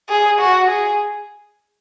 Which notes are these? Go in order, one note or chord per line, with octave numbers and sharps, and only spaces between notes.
G#4
F#4
G#4